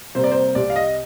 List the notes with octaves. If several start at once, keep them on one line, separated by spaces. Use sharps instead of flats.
C3 G3 A#3 C5
D5
C5
C2 D5
F5
D#5